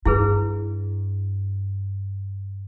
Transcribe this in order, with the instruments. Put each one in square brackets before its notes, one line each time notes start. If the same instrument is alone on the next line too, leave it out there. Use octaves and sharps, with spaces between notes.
[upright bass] G2 [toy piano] E4 G#4 B4